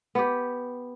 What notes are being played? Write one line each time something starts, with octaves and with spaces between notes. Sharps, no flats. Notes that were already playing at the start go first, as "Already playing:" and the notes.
B3 G4